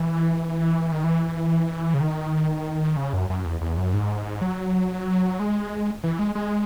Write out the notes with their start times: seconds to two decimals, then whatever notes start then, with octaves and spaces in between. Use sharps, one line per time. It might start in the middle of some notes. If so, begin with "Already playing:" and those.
Already playing: E3
0.92 D#3
1.04 E3
1.94 C#3
2.01 D#3
2.96 C#3
3.13 F#2
3.30 F#2
3.45 E2
3.61 E2
3.77 F#2
3.94 G#2
4.42 F#3
5.40 G#3
6.04 E3
6.19 G#3
6.35 G#3